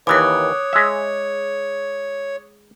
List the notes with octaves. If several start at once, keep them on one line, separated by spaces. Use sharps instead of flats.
D#2 E3 C#5 D6 D#6 F#6
G#3 E5